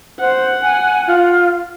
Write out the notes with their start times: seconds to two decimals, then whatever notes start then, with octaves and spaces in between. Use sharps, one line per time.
0.20 C5 F#5
0.62 G#5
1.07 F4